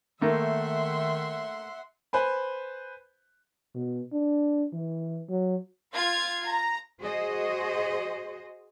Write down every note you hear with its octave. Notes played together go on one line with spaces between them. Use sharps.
D#3 A3 A#3 E5 F#5 C6
B4 C5 G#5 B5
B2
D4
E3
F#3
F4 F5 G#6
A#5
F#4 G#4 C5 D#5